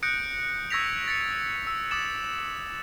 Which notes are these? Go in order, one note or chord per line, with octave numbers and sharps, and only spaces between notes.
D#6 F#6 G6 A#6 C#7 D7
C#6 E6 G#6 A#6 B6 F7
A6 A#6 C#7
E6
D6 D#6 A6 E7 F#7